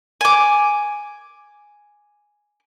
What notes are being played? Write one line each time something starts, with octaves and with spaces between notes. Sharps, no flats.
G#5 D6